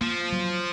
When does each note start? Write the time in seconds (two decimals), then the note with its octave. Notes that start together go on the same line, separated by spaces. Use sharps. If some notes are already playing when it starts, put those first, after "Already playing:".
0.01 F3 A#3
0.32 F#3